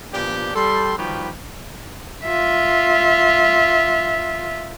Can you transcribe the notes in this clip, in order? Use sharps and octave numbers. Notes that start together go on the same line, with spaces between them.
A#2 F3 B3 D4 G4
G3 A4 C6
D#3 F3 G3 F#4 G4 B4
F4 E5